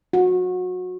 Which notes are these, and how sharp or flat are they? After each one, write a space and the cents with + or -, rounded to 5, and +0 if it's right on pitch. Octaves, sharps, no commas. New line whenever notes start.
F#4 -25